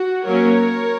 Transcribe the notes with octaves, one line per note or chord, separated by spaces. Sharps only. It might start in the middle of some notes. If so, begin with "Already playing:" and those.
Already playing: F#4
F#3 A#3 C#4 A#4 C#5